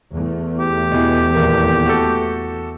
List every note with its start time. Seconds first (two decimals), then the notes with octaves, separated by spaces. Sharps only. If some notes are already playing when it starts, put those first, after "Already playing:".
0.15 E2 A3
0.59 G4
0.92 B2 E3
1.34 D#1 A#3
1.86 F#4 A4